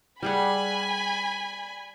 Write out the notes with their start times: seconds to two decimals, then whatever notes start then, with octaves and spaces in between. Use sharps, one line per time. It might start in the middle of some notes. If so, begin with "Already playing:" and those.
0.22 G3 G#4 F#5 G#5 B5